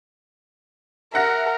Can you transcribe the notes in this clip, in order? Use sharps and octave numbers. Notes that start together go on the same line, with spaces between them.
A#4 E5 F#5 A#6